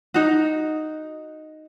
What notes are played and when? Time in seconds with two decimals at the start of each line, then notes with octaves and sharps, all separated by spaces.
0.14 D#4 F#4